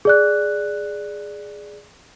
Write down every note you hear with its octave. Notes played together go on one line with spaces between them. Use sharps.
G#4 D5 F#6